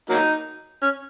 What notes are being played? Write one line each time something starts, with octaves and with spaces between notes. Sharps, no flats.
F#3 A#3 D#4
C#4